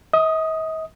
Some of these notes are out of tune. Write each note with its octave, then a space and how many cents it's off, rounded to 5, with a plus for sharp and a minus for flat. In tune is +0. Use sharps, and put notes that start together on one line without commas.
D#5 +45 D#6 +0